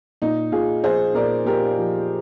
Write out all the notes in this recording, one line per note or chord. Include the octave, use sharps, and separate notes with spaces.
A#2 D#4
A#2 F4 G#4
F3 G#4 C5
A#2 A#4 D5
A#2 G4 A#4
F3